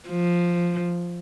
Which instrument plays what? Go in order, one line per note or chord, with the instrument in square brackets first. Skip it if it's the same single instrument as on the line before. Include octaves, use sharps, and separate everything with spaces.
[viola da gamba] F3